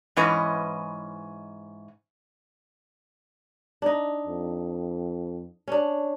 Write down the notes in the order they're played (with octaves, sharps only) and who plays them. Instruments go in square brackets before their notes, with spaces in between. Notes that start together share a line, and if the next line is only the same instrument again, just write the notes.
[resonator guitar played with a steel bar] G#2 E3 C#4 B4 D#5
[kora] D4 D#4
[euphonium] F2
[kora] C#4 D4